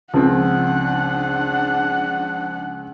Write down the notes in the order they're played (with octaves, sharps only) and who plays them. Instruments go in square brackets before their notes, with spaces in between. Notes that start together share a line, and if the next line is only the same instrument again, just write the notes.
[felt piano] C#2 [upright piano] F3 C4 [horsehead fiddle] D4 F#5